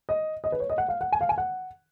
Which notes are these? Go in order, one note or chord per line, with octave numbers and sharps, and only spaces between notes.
D#5
D#5
B4
C#5
D#5
F#5
F5
F#5
G#5
F5
G#5
F#5